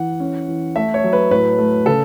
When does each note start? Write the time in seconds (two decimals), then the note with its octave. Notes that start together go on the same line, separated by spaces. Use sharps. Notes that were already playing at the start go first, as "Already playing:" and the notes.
Already playing: E3 F#5
0.20 C#4
0.48 E3
0.76 A3 E5
0.94 C#5
1.03 F#3
1.13 B4
1.31 A2 B4
1.59 A3
1.86 C#3 A4